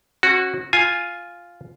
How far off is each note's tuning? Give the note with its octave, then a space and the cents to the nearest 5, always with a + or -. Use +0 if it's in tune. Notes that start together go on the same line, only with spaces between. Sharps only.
C#4 -35 F#4 +0
F4 +0 G#5 +0